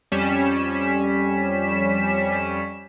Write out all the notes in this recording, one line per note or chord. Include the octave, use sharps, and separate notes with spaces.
F2 G3 C#4 B6 E7